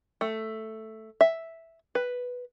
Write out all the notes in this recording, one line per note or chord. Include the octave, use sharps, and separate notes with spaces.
A3
E5
B4